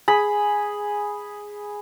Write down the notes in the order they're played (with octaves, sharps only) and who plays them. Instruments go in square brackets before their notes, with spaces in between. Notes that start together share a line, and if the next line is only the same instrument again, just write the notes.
[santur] G#4 B5